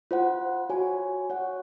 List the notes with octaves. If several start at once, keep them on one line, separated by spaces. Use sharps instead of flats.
F4 C5 F#5
F#4 C#5 G#5
F#4 C#5 F#5